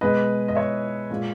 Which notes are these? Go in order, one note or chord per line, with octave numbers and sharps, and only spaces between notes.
B2 G#3 B4 D#5
D#5
C#5 E5
A#2 G#3